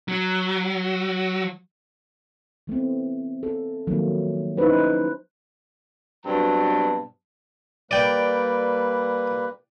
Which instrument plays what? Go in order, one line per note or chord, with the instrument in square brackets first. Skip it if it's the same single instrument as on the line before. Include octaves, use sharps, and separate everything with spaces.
[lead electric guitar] F#3
[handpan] E3 A3 B3 C4
A4
D#3 F3 F#3 A3 A#3
C#4 D#4 E4 B4 C5
[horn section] G2 B2 F#3 C4 A5
[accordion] G3 A#3 B4 [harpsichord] D5 G5